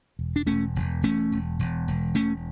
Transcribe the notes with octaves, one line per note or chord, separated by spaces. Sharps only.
E1
D4
E1 A3 C#4
E1
E1 A3 C#4
E1
E1
E1
E1 A3 C#4